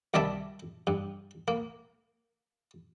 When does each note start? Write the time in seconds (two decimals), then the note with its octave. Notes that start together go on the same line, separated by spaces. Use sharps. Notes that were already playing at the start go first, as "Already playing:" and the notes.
0.14 C2 D#3 G3 D5 E5 A5
0.87 G2
1.48 A#3